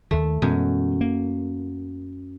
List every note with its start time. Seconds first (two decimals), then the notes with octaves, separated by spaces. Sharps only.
0.11 D#2 D#3 A3
0.42 F#2 B2 E3 G#3
1.01 A#3